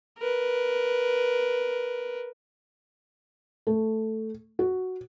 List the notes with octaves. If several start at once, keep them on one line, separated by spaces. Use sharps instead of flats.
A#4 B4
A3
F#4